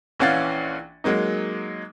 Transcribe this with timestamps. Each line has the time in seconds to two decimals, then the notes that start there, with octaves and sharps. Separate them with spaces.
0.20 A#1 E3 C#4 F5 F#5 A6
1.04 F#3 G#3 A#3 D#4